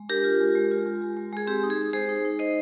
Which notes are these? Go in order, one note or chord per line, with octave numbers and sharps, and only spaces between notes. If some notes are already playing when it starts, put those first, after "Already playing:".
Already playing: G#3
D4 G4 A#4
F4
G#3
G#3
F4
G#3
G#3
G#3
G#3 G#4
C4 G4
D#4
G#4
G#3
G#3 G#4 C5
D#4
D#4
D#4 C5 D#5